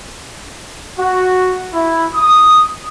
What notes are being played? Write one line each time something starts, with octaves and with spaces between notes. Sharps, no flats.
F#4
E4
D#6